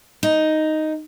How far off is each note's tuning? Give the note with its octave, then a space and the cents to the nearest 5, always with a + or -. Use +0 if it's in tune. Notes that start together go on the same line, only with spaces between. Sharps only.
D#4 +0